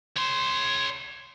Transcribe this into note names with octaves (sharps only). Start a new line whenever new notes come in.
C#5 C6